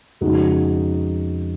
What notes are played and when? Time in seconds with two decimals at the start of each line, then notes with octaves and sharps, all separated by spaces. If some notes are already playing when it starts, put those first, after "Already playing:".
0.21 F2 C#3 G#3 D#4 F#4